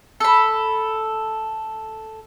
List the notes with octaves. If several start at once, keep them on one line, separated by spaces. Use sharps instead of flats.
A4 B5